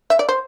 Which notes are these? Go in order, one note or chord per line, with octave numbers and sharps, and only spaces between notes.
E5
D5
C5